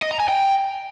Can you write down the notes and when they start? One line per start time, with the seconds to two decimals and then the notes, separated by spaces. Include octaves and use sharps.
0.02 D#5
0.11 A#5
0.20 G#5
0.28 G5